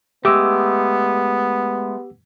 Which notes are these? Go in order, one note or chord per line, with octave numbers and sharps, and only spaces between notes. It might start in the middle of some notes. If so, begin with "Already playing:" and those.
G#3 A3 B3 G4 D6 E6